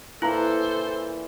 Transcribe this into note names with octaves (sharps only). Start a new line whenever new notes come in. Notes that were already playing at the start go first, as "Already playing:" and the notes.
A#2 E3 E4 A4 C5 F5 A#5